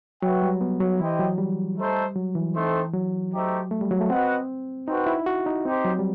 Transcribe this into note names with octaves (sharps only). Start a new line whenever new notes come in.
F#3 F#4 B4 E5 G5
G3
B3
F#3
E3 E4 G4 C5 D#5 G5
F#3
G3
A3 D#4 A4 C5
F#3
E3
A3 C4 D#4 A4 C5
F#3
A3 D#4 G4 C5 E5
A3
G3
F#3
A3
C4 F#4 B4 D#5 F#5
C4 D#4 F#4 B4
E4
F#4
D#4
C4 D#4 G4 C5
F#3
G3